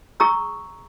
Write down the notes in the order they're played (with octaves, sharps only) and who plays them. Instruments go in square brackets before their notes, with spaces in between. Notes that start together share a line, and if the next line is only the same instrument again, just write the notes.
[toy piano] G#4 A#5 C#6 D#6 E6